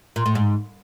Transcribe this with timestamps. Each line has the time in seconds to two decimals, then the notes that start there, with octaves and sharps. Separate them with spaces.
0.16 A#2
0.26 A2
0.35 G#2